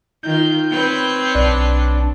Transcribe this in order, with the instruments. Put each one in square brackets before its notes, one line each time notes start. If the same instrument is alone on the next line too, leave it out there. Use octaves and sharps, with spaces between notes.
[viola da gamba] D#3 F4 [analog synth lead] G6
[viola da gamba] C4 B4 C#5
[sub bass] B1 [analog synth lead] D4